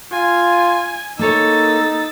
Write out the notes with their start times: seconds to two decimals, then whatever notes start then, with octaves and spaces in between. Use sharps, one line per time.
0.12 F4 G#5
1.19 A#3 D#4 A4 C#5 E6 A6